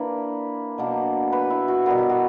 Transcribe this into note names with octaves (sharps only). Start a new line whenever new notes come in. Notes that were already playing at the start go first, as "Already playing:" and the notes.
Already playing: E3 A#3 D4 B4
B2 F#3 A#3 D4
B4
E4
F#4
B2 G3 B3 A#4
G4
F#4